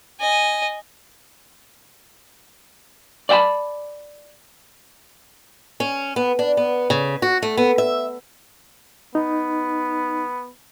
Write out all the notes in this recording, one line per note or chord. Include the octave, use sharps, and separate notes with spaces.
D#5 G#5
D5 F5 G5 A5 B5
C#4
B3
D4
B3
C#3
F#4
A3
B3
E5
B3 D#4